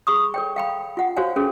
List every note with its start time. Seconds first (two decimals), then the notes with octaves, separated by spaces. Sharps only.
0.07 G#4 B5 C#6 D#6
0.34 A4 C#5 G5
0.56 F5 G5 B5
0.97 F4 F#5
1.17 F#4 C5 C#5 F5 G#5
1.36 C#4 G#4 A4